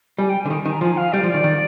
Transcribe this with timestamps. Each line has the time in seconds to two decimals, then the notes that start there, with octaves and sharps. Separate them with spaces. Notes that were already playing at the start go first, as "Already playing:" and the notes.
0.18 G3 G#5
0.29 G5
0.41 D3 G#5
0.50 D#3
0.65 D#3
0.72 A#5
0.81 F3 G#5
0.97 F5
1.12 G3 D5
1.23 F3
1.29 D#3 D5
1.44 D#3